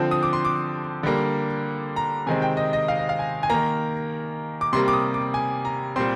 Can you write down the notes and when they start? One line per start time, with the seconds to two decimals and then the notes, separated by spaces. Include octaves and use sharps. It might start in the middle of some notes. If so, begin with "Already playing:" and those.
Already playing: D3 F3 C4
0.11 D#6
0.23 D6
0.33 C6
0.45 D6
1.03 D3 G3 A#3
1.96 A#5
2.27 C3 D#3 G#3 C4 G#5
2.42 G5
2.57 D#5
2.73 D#5
2.88 F5
2.99 D#5
3.09 F5
3.19 G#5
3.43 G#5
3.50 D#3 A#3 A#5
4.61 D6
4.73 C3 G3 A#3 C6
4.88 D6
4.93 D#6
5.14 D6
5.34 G#5
5.65 A#5
5.96 A#2 G3 C4 C6